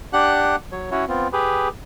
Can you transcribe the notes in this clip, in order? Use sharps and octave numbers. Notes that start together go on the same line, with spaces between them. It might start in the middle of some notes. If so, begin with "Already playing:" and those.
D4 G4 F#5 F#6
F#3 C#5
C#4 E4 F#4 C#5
B3 C4 F4
G4 G#4 B4